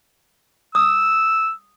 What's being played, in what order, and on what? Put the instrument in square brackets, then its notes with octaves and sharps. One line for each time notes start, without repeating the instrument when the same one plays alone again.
[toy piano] D#6 [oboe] E6